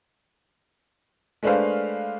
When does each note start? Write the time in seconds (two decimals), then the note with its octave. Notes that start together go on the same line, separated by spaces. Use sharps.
1.43 G#3 A3 D4 B4 C5 F5